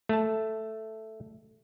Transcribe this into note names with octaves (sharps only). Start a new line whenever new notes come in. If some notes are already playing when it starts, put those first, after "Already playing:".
A3 A5